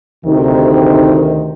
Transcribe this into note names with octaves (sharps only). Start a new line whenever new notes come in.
D2 C3 D#3